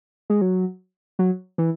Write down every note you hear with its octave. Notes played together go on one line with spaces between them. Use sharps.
G#3
F#3
F#3
E3